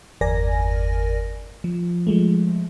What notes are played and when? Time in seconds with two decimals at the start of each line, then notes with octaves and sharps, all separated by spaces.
0.21 G1 E2 A#4 D5 G#5 A#6
1.64 F3
2.07 F3 G#3 A3